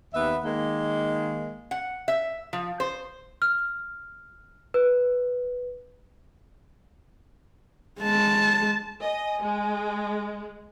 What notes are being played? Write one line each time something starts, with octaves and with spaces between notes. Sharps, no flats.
D#2 B3 E5
D#3 G#3 A#3
F#5
E5
F3
C5
F6
B4
G#3 A5
D#5 G#5
G#3